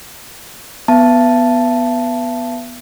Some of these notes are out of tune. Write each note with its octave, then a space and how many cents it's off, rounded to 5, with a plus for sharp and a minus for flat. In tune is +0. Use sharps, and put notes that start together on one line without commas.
B3 +0 E5 +45 A5 +0